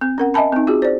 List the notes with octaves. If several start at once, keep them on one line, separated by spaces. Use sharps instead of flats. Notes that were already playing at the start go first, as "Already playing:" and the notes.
C4
C#4 A#4 F#5
D#5 E5 G#5 A5 B5
C4 D#4
F4 F#4 G#4
C5 D5